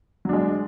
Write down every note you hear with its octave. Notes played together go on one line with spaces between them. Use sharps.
F#3 G#3 D4